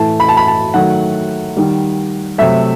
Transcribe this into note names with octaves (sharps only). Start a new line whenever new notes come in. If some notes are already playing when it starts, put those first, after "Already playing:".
Already playing: A2 E3 A3 A5
B5
A5
B5
A5
D#3 F#3 A3 F#5
D#3 G3
C3 F#3 A3 E5